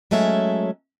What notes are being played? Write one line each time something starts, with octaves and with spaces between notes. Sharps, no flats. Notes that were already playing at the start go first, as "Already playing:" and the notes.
F#3 G#3 A3 C#4 E5